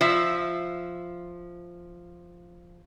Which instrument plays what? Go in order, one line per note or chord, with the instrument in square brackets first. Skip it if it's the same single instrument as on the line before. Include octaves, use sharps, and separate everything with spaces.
[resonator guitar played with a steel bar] F3 E5